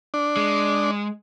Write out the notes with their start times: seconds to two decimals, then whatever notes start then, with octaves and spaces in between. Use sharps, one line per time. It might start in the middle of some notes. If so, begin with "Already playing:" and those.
0.14 D4
0.37 G#3